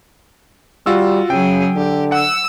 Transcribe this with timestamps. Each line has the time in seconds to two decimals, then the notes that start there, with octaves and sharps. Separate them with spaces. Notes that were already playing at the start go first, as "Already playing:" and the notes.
0.86 G3 F4 F#4 E6
1.30 C#3 F#3 G#4 G5
1.76 D3 G4
2.12 F#5 E6